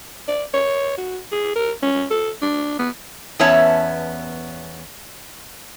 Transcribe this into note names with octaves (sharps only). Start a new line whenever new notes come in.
D5
C#5
F#4
G#4
A#4
C#4
A4
D4
B3
E2 B3 C#4 C#5 E5 A5